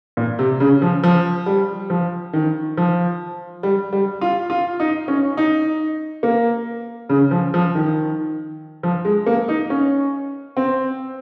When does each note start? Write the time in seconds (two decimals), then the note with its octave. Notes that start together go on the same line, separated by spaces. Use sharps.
0.17 A#2
0.39 C3
0.60 C#3
0.82 F3
1.03 F3
1.46 G3
1.90 F3
2.33 D#3
2.77 F3
3.63 G3
3.93 G3
4.21 F4
4.50 F4
4.80 D#4
5.08 C#4
5.37 D#4
6.23 A#3
7.09 C#3
7.31 F3
7.54 F3
7.75 D#3
8.83 F3
9.05 G#3
9.26 A#3
9.48 D#4
9.70 C#4
10.57 C4